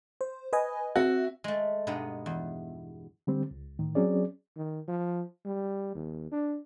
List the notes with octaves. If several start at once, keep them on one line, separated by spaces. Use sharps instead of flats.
C5
B4 D#5 G#5
C4 F#4 E5
G#3 A3
G2 B2 G#3 B3 D#4
E2
D3 G3 C4
C#2
A2 D#3
F#3 C4 C#4 G#4 D5
D#3
F3
G3
D#2
D4